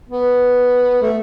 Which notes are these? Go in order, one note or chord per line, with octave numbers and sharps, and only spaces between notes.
B3
A3